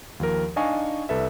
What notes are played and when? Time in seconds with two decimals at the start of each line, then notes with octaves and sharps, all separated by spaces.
0.20 D#2 F3 A#4
0.56 D4 D#4 D#5 F5 G#5 C#6
1.09 C2 A4 B4 E5